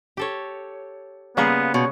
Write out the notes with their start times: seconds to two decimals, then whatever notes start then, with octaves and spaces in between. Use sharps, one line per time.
0.17 G4 A4 C#5
1.37 C#3 G3 A#3 B3 F4 G#4
1.74 B2 C#5